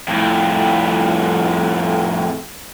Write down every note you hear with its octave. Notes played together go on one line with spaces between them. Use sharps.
F2 A2